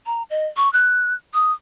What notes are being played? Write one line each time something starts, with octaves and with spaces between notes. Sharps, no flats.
A#5
D#5
C#6
F#6
D#6